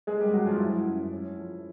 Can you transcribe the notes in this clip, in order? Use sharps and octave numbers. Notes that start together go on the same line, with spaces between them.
G#3 A#3 G#4
G3 G4
F#3 F#4
F3 F4
F3 E4
F#2
C#4
F3